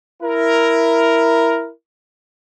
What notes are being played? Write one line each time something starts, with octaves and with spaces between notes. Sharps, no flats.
E4 A#4